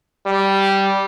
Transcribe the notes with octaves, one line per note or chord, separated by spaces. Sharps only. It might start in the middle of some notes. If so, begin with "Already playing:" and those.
G3